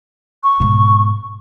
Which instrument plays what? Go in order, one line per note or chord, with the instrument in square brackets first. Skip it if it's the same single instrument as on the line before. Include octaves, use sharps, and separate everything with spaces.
[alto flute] C#6
[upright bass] G#2 B2